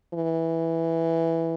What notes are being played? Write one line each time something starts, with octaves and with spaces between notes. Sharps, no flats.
E3